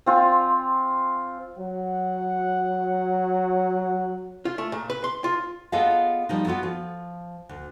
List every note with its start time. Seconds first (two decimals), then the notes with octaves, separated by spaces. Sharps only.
0.06 C4 F4 G#5
1.58 F#3 F#5
4.45 F4
4.58 A3
4.72 A#2
4.90 B4
5.04 C6
5.24 F4
5.72 B3 F4 G#4 A4 D#5 F5
6.29 F3 G3 D#4
6.46 B3 F4 F#4 A4
6.63 F3
7.49 D2